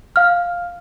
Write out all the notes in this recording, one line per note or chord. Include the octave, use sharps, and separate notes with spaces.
F5 F6